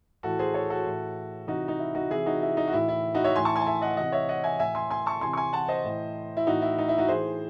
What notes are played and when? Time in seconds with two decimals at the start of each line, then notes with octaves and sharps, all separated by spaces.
0.23 A2 E3 F#4 A4
0.39 G#4 C5
0.54 A4 C#5
0.70 F#4 A4
0.85 A2 E3
1.47 C3 E3 D#4 F#4
1.68 D#4
1.79 E4
1.95 D#4 F#4
2.10 C3 E3 E4 G#4
2.26 D#4 F#4
2.42 E4
2.57 D#4
2.68 F#4
2.73 A2 E3 E4
2.88 E4
3.14 D#4 F#4
3.24 C#5 E5
3.35 A2 E3 G#5 C6
3.45 A5 C#6
3.56 G#5 C6
3.61 A5
3.67 E5 G#5
3.82 D#5 F#5
3.97 C3 E3 D#5 F#5
4.12 C#5 E5
4.29 D#5 F#5
4.44 E5 G#5
4.59 A2 E3 E5 G#5
4.75 G#5 C6
4.91 G#5 C6
5.06 A5 C#6
5.21 C3 E3 G#5 C6
5.33 C#6
5.37 G#5 C6
5.53 F#5 A5
5.68 C5 D#5
5.84 A2 E3
6.37 E4
6.46 A2 E3 D#4 F#4
6.62 E4
6.78 D#4
6.89 E4
6.98 D#4 F#4
7.08 A2 E3 G#4 C5